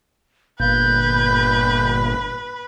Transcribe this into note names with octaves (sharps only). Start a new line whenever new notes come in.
G1 A#2 A#3 B4 G6